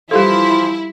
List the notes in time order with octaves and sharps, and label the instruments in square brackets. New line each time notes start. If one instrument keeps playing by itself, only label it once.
[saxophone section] E3 F3 [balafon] G3 G4 A4 [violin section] E4 [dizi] C6